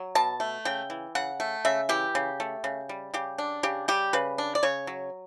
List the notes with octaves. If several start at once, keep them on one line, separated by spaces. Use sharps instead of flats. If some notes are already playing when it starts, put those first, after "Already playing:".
Already playing: F#3
B2 A5
A3
C#3 G5
E3
C#3 F#5
A3
C#3 E5
E3 G4
C#3
A3
C#3
G3
C#3 G4
D4
C#3 G4
G3 G4
C#3 B4
D4
D5
C#3 C#5
F#3